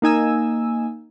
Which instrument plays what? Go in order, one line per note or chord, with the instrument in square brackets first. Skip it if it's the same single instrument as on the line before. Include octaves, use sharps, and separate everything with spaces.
[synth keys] A#3 D#4 G#5 E6